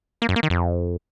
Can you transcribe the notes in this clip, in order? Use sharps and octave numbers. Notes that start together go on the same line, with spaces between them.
A#3
F#2
A#3
D#3
F2